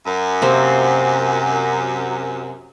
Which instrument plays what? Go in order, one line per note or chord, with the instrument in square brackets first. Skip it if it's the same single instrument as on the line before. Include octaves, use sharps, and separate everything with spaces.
[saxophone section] F#2
[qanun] C3 A#3 C4